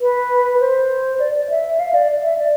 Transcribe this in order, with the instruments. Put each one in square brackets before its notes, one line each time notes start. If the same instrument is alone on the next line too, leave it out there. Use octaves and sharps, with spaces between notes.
[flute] B4
C5
D5
D5
E5
F5
D5
E5
D5